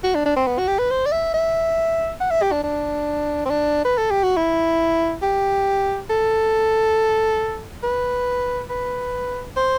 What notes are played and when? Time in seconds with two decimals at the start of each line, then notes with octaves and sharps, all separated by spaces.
0.04 F#4
0.15 D4
0.26 D4
0.36 C4
0.47 B3
0.58 F#4
0.68 G4
0.79 B4
0.91 C5
1.06 D5
1.12 E5
1.34 E5
2.21 F#5
2.31 E5
2.42 G4
2.52 D4
2.64 D4
3.46 C4
3.50 D4
3.85 B4
3.98 A4
4.11 G4
4.23 F#4
4.37 E4
5.23 G4
6.10 A4
7.84 B4
8.70 B4
9.57 C5